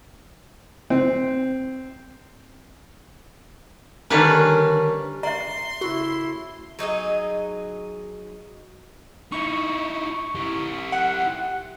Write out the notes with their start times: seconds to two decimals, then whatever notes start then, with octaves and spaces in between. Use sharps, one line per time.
0.90 C4
4.10 D3 D#3 G3 A#3 C#4 B4
5.23 D5 E5 A#5 C6
5.81 C#3 A3 E4 F#4
6.79 F#3 D#4 G#4 D#5
9.32 D#4 E4 C#6
10.35 E4 G4
10.92 F#5